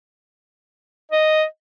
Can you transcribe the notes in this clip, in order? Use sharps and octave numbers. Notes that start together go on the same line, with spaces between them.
D#5